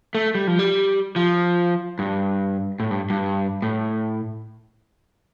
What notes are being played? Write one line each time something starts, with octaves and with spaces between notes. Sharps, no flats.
A3
G3
F3
G3
F3
G2
A2
G2
G2
A2